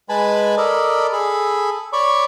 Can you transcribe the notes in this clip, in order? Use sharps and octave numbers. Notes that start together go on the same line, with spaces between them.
G#3 B4 G#5 A5 B5
A4 A#4 D5 D#5 B5
G#4 A4 B5
C#5 D5 B5 C#6 D6